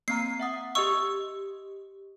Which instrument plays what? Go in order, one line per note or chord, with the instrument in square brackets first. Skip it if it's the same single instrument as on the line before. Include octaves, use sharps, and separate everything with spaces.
[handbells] A#3 C4 A#5 [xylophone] C7
[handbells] E5 F#5 D#6
[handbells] G4 D#5 D#6 [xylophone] C#6 E6